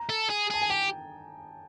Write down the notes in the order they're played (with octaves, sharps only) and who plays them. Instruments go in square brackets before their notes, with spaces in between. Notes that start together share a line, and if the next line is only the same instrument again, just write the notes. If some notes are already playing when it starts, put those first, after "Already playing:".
Already playing: [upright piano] A#5
[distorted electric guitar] A4
G#4
[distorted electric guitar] G#4 [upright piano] A5
[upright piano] G#5
[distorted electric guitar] G4 [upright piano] G5